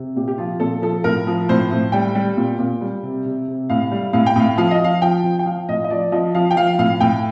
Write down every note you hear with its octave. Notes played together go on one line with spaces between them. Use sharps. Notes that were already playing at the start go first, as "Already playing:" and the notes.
Already playing: C3
A#2 G4
G4
F3 F4
A#2 A4
F3 A4
A2 A#4
F3
A2 C5
A2
G3 G5
G3
A#2
A#2
G3
C3
C3
C3
A2 F5
G3
A2 F5
G5
A2 F5
F3 F5
D#5
F3 F5
F3 G5
F3
G5
F3 F5
A2 D#5
D#5
F3 D5
F3 D#5
F3 F5
G5
F3 F5
A2 F5
A2 G5